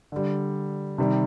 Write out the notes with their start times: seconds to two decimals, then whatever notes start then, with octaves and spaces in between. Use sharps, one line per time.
0.12 D3 G3
0.98 C3 D#3 G3